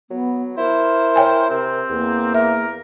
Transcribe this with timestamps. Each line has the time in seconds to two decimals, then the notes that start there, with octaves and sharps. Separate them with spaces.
0.10 F#3 B3
0.57 E4 A#4 C5
1.16 C#5 G5 G#5
1.50 C3 C4
1.90 E2 A#3
2.34 A#4 E5